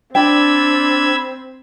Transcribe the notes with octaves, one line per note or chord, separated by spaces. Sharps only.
C4 D4 G5 B5 E6 G#6